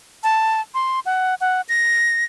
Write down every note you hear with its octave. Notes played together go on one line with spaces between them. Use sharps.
A5
C6
F#5
F#5
A#6